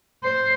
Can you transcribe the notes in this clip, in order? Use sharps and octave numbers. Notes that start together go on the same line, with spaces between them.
C5